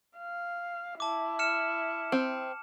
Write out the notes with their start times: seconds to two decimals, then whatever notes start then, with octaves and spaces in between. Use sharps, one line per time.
0.18 F5
1.00 E4 A5 D6
1.39 F6 C#7 E7
2.12 C4